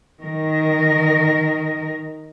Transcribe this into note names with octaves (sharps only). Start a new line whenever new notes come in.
D#3 A#4